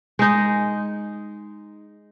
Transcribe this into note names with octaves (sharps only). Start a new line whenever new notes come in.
G#3 D#4